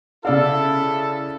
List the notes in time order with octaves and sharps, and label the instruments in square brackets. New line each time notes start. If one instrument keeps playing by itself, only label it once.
[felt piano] C#3 D5 F5 [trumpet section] E4 A4